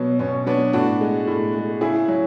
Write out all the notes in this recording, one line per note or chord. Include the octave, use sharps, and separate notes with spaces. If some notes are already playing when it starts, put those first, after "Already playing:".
Already playing: B2 F#3 B3
B2 C#4
F#3 B3 D4
A2 D4 F#4
G#3
A2
G#3
C#3 E4 G#4
F#3